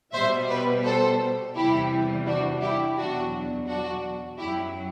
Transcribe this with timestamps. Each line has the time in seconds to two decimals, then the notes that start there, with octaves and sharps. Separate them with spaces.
0.13 B2 G3 C5 E5
0.48 B4 D5
0.84 A4 C5
1.55 E2 C3 E3 G3 E4 G4
2.26 D4 F#4
2.61 E4 G4
2.96 E2 B2 F#3 D4 F#4
3.67 D4 F#4
4.38 F#2 F#3 E4 G4